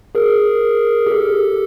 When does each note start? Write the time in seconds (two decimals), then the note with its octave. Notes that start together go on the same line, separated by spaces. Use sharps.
0.15 G#4 A#4
1.07 G4 A4